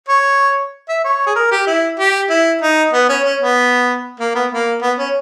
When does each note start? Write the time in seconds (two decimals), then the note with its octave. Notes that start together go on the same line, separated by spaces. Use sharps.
0.09 C#5
0.89 E5
1.04 C#5
1.26 G#4
1.35 A#4
1.51 G4
1.67 E4
1.99 G4
2.30 E4
2.61 D#4
2.93 B3
3.09 C#4
3.24 C#4
3.41 B3
4.19 A#3
4.35 B3
4.52 A#3
4.82 B3
4.98 C#4